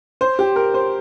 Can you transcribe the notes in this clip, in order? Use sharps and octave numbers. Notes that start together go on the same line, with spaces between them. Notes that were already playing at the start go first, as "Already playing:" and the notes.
C5
G4
A#4
C5